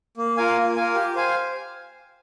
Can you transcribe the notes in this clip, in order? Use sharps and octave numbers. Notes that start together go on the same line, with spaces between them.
A#3
F4 A#4 F5 G#5
A#3
F4 A#4 F5 G#5
G4
C5 F5 G#5